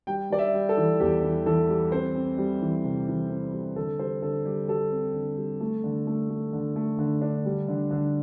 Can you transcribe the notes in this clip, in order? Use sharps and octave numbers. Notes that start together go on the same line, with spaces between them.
G3 G5
G3 D5
E5
G3
A4
E3
E2 G4
E3
E3 A4
G3
C4 C5
C4
G3
E3
C3
E3
C4
G3
D3 A4
G3 C5
D3 A4
G3 G4
G3 A4
C4
D3
G3
A3
D3
A3
A3
D3
A3
D3
D4
G3
D3
D3